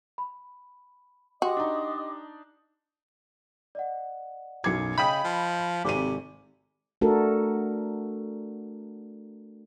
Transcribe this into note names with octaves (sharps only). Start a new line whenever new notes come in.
B5
F#4 G4 D#5 G5 C6 D6 D#6
D4 D#4
D5 D#5 F#5
B1 F#2 D6 G#6 C7 C#7
C#3 D#5 G5 B5 D#6 G6
F3
G#1 C3 A4 G#5 D6 D#7
A3 D4 F#4 A4 A#4